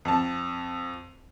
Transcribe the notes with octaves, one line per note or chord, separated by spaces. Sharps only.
F2 A5